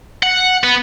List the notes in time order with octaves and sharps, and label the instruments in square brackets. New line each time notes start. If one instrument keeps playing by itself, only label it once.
[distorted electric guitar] F#5
B3